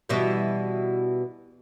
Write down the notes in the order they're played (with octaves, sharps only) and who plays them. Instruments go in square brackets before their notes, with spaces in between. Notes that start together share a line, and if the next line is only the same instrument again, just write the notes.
[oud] B2 E3 G3